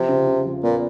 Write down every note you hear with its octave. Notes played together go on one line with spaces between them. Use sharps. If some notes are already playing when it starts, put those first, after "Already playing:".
Already playing: C3 F3
C#3
C#3
F3
A#2 B3